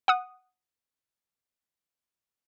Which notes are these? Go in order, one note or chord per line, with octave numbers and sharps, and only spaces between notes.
F#5 D#6